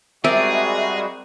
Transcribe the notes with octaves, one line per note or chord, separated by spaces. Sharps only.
G3 G#3 C4 F#4 G#4 A#4 D5 E5